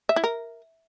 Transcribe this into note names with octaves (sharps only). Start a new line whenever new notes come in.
E5
E4
A#4